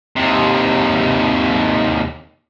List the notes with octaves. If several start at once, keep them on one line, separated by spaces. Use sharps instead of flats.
D#2 C3